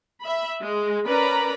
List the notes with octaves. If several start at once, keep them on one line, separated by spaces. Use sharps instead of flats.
E5 B5
G#3
C#4 A#4 B4 D5 A#5 B5